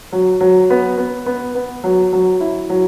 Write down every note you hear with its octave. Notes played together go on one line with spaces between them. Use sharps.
F#3
F#3
B3
B3
B3
B3
F#3
F#3
E4
F#3